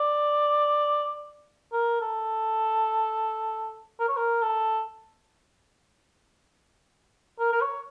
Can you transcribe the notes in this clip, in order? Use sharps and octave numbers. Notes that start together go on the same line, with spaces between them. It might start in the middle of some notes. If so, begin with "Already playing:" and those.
Already playing: D5
A#4
A4
A#4
C#5
A#4
A4
A#4
A#4
C#5